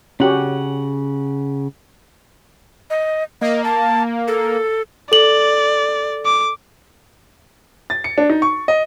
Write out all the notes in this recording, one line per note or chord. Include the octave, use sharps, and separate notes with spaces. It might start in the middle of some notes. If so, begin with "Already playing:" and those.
C#3 C#4 F#4 G4 F#5
D#5
A#3 D#5
A5
A4
A4 D5 F#7
D6
A6
C#7
D4
D#4
C#6
D#5